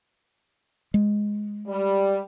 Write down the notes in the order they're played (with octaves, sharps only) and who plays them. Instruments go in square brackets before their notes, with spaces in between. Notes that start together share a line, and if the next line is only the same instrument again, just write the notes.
[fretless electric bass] G#3
[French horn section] G3